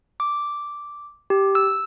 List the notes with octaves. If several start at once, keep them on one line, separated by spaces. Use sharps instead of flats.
D6
G4
E6